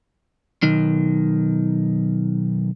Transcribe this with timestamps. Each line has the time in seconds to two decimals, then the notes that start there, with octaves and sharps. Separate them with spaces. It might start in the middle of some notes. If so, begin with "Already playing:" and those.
0.63 B1 D#3